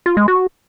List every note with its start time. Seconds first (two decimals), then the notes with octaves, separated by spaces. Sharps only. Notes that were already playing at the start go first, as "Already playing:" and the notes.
0.06 F4
0.17 G#3
0.28 F#4